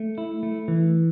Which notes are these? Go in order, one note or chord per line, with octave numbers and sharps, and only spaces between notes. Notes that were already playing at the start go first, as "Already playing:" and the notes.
Already playing: A3
E4
A3
E3